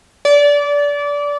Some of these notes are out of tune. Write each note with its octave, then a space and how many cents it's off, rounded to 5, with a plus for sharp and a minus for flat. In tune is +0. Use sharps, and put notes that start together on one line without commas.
D5 -25